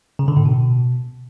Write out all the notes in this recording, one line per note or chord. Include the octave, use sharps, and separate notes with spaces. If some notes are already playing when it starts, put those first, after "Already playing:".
C#3
D3
A2
B2